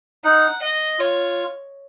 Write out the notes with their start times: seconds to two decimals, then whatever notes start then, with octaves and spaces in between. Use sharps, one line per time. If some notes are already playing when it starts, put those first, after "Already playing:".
0.24 D#4 F#5
0.62 D#5
0.99 F4 C#5